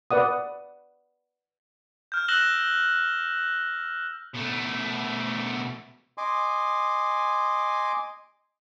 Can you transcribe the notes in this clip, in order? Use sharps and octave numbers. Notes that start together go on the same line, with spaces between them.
B4 D5 F#5 D#6
F6 G6
E6 F#6 A#6 E7 F#7 G7
B2 A3
D#5 G#5 C6 D6